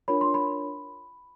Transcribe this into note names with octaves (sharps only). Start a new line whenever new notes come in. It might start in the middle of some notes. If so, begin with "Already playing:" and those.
D4 F4 A#4 C#5 B5
C6
B5